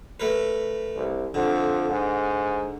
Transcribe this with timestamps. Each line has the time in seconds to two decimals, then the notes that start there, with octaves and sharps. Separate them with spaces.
0.20 A3 A#4 B4
0.96 C2
1.34 F2 D3
1.90 G#2